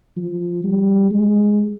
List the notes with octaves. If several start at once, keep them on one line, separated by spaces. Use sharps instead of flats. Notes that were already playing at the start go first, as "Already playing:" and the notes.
F3
G3
G#3